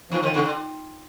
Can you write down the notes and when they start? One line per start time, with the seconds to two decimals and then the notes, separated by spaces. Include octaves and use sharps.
0.11 D#2 D#3 F3
0.23 F2 D#3 F3
0.34 D#2 D3 D#3
0.45 D3